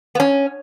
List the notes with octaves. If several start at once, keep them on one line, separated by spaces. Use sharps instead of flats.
B3
C#4